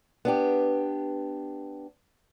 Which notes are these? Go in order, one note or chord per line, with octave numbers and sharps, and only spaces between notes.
B3 D4 G4